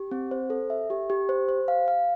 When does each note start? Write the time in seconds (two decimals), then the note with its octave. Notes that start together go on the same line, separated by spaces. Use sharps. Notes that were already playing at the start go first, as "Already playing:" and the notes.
Already playing: G4
0.11 C4
0.31 C5
0.50 A4
0.70 E5
0.90 G4
1.10 G4
1.29 C5
1.49 C5
1.68 F5
1.88 F5